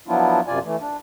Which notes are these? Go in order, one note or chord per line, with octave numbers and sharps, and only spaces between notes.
F3 F#3 B3 D4 E4 F4
F#2 C3 F4 D5 G#5
E3 A3
D4